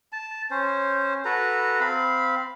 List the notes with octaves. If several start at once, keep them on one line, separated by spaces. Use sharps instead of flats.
A5
C#4 C5
F#4 A4 B4 A#5
C4 F5 B5